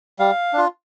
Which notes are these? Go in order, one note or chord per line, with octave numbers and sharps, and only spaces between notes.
G3 F5
D4 F4